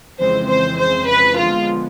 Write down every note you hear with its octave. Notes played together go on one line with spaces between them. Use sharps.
F2 C#3 E3 G#3 C4 C5
C5
C5
B4
D3 F3 G#3 B3 F4